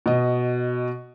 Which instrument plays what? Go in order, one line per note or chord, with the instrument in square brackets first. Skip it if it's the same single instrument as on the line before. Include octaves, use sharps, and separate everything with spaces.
[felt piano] B2 D#5